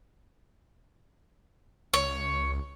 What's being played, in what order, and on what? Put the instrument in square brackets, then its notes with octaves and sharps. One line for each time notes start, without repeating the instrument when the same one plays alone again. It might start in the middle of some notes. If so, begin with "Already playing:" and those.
[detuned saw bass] C#2 [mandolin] C#5